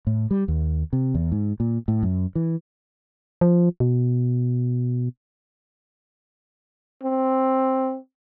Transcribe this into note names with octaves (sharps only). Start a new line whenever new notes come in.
A2
G3
D#2
C3
E2
G#2
A#2
A2
F#2
E3
F3
B2
C4